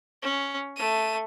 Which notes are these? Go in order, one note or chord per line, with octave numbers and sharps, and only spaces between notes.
C#4
A3 D#7